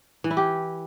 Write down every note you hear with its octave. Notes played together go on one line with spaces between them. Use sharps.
E3
E4
G4